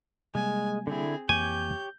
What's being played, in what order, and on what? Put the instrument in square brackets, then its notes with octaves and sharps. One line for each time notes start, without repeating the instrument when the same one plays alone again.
[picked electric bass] C3 G3 A#3 [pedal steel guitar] G#3 [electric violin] G#5
[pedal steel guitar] D3 E4 [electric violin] C4 G#4
[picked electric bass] F2 E3 A#3 [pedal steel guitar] G4 C#5 [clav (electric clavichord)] G#5 [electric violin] G6